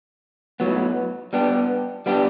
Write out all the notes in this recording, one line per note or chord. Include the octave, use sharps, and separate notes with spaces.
A2 F#3 B3
G3 B3 D4 G4
G3 B3 D4 G4